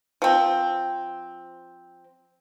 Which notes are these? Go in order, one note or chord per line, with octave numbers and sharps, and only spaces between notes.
F3 C4